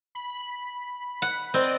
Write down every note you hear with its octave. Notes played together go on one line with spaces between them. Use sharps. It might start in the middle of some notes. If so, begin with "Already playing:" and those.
B5
F#5
C4 D5 D#5 G5